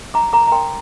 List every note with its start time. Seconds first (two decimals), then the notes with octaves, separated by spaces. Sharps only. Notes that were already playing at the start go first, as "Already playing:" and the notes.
0.14 D4 A#5 D6
0.33 A#4 A#5 D6
0.47 A#5
0.52 A#4 G5 C6